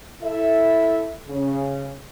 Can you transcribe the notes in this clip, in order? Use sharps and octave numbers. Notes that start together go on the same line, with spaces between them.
E4 A4 E5
C#3